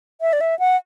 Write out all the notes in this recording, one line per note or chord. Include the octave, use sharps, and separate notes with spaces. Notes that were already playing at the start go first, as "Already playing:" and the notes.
E5
D5
E5
F#5